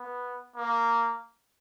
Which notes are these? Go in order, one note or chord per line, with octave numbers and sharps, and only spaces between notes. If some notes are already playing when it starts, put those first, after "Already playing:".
Already playing: B3
A#3